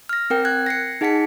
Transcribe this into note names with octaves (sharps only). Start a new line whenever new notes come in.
F6 A#6
C4 A#4 G5
F#6 G#6
A#6 C7 C#7
D#4 G#4 F#5 A5 B6 C#7